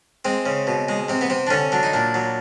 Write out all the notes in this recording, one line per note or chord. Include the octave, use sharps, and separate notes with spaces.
G#3 C4
C#3
B2
G#3
C3 C4
B3
C3 C4
D4
D3 C#4
F#3 D4
D#4
A#2 D4
F#3